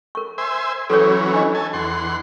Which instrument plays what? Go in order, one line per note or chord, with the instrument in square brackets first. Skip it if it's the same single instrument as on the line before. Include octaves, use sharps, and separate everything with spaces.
[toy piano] A#4 C#6
[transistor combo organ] C5 E5 G#5
[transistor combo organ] E3 F#3 C#4 [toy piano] A4 B4 C#5
[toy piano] D4 D#5
[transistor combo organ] A4 G#5
E2 F#5 C6